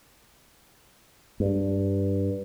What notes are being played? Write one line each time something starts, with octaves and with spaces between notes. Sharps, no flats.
G2